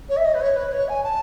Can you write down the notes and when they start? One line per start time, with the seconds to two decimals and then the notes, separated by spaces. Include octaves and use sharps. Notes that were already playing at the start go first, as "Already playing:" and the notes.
0.08 C#5
0.16 E5
0.24 D#5
0.34 B4
0.41 C#5
0.56 B4
0.72 C#5
0.88 G#5
1.03 A5